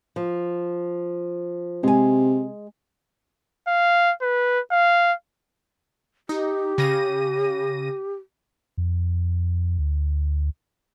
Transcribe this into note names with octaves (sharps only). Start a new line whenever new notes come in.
F3
C3 G#3 G#5
F5
B4
F5
D#4 G4
C#3 A#6 D#7
F2
D2